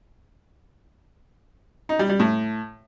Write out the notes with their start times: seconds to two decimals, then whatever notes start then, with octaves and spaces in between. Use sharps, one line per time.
1.89 D#4
1.99 G3
2.09 G3
2.20 A2